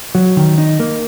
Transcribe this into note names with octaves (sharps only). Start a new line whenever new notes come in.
F#3
D#3
D#4
A#3